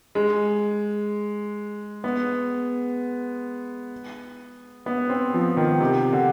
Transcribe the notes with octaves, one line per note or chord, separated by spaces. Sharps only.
G#3
B3
B3
C4
F3
D#3
C3
D3